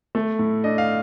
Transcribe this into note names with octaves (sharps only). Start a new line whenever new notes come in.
A3
A2
D4 D#5
F5